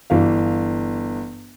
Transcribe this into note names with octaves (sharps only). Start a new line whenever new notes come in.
G1 E3 F5